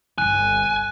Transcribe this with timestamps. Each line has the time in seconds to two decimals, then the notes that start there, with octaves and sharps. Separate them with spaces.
0.18 G1 C2 G#5 F#6 D#7